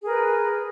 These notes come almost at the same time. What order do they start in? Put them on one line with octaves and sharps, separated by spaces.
G#4 A#4 B4